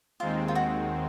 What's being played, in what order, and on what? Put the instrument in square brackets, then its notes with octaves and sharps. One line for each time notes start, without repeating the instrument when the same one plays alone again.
[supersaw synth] D#2 D#3 G#3 C4 [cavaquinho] F4
[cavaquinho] F4
F#4